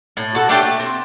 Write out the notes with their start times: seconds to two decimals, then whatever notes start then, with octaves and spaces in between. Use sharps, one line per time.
0.17 A2
0.35 F#4 A4
0.49 A3 D4 G4 G5
0.63 A3
0.80 C4